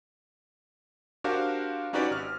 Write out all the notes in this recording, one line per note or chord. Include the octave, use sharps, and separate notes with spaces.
D4 F#4 G4 A#4 C5 F5
C#4 D#4 F#4 G4 B4 D5
G#1 F6